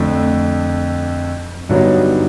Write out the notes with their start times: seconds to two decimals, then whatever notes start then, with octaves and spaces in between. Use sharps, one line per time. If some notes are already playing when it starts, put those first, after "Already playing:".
Already playing: F2 D3 F3 A3
1.69 G2 D3 F#3 B3 D#4